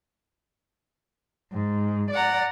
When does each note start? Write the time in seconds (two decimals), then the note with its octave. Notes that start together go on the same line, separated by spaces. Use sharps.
1.51 G#2
2.11 D5 F#5 A#5